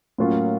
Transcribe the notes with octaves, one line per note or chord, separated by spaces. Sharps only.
A2 F#3 A#3 C#4 F4